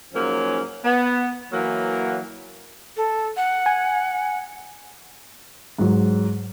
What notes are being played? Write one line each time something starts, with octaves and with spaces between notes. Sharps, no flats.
G#2 F3 F#3 A#3 C#4
B3
E3 F#3 A#3
A4
F#5
G#5
G#2 F#3